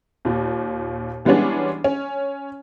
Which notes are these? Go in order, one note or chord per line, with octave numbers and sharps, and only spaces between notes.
D#2 A#2
E3 G3 G#3 B3 C#4 D4
C#4